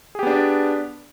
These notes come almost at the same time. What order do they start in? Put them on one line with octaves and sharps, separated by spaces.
G#4 G4 B3 D4 D5